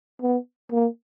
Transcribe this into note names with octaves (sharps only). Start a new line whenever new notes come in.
B3
A#3